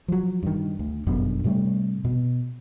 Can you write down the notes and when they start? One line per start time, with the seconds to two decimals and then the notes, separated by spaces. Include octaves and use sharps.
0.08 F3 F#3
0.43 G2 D#3
0.79 D2
1.07 G1 F#2 B2 D3
1.44 A2 C3 G3 A3
2.05 B2